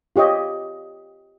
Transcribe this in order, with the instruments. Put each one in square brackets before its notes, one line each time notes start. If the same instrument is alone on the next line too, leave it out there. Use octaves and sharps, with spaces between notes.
[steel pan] F4 G4 C#5 D#5